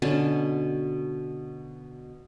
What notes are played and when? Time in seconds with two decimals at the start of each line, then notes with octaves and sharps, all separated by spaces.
0.02 B2 D3 C#4 A5